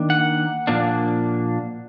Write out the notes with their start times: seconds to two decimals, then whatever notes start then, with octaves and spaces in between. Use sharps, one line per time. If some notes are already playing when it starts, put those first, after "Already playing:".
Already playing: D#3 A#3 D4
0.10 F#5
0.67 A#2 F3 A#3 D4